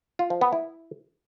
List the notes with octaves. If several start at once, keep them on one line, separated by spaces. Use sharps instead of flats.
F4
F3
B3
E4